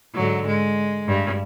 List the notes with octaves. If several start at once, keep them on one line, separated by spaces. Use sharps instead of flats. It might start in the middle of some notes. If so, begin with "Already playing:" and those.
G#2 D3 F#3
G#3
G2